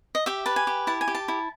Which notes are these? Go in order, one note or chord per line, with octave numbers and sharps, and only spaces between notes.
D#5
G4 E5
B4 A5
G#5
G4
E4 A5
G#5
G4
A5
E4